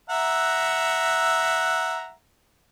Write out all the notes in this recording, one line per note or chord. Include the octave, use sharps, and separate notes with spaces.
E5 F#5 A#5